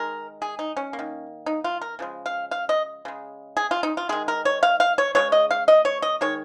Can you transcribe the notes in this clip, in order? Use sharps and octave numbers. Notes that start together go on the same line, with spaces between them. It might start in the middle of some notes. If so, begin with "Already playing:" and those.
Already playing: D#3 G#3 A#4
G#4
D#4
C#4
A#3
D#3
D#4
F4
A#4
C#3 F3 G#3
F5
F5
D#5
C#3 G#3
G#4
F4
D#4
F4
D#3 G#3 G#4
A#4
C#5
F5
F5
C#5
C#3 F3 G#3 C#5
D#5
F5
D#5
C#5
D#5
D#3 G#3 C#5